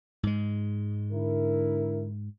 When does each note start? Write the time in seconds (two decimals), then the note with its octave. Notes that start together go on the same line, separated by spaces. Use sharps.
0.23 G#2 G#3
1.12 D3 E4 A#4